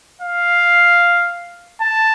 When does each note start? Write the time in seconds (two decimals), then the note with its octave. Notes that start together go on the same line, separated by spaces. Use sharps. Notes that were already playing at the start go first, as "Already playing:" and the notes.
0.21 F5
1.81 A5